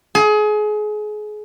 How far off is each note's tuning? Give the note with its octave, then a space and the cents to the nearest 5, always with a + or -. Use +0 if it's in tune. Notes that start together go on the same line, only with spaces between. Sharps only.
G#4 +30